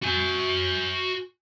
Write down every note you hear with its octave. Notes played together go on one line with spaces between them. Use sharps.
F#4 G#5